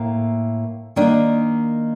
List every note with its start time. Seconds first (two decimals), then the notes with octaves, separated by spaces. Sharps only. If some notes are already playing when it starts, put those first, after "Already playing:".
Already playing: A2 A#3
0.96 D#3 A#3 D4